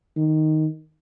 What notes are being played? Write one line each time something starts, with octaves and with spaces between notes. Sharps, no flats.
D#3